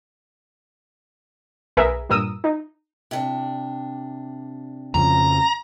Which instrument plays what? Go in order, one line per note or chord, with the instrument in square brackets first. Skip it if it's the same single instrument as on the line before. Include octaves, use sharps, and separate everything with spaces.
[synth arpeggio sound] B1 G#4 A#4 B4 E5
G2 A#2 A#4 D#6 E6
D#4
[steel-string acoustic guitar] C3 D4
[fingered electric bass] F2 C#3 F3 [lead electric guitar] A#5